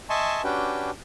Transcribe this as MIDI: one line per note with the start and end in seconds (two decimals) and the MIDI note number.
0.10 0.42 75
0.10 0.42 76
0.10 0.42 80
0.10 0.42 81
0.10 0.42 84
0.10 0.42 85
0.44 0.90 61
0.44 0.90 62
0.44 0.90 66
0.44 0.90 67
0.44 0.90 71
0.44 0.90 79